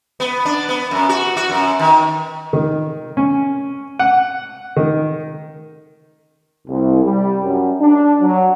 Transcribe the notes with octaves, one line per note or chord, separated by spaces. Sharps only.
B3
D4
B3
F#2
F#4
F#4
F#2
D#3
D#3
C#4
F#5
D#3
C2
G3
F#2
D4
F#3